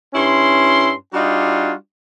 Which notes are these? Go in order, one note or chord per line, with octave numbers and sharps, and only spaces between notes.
G2 C#4 E4 C6
G3 D4 D#4 F4 F#4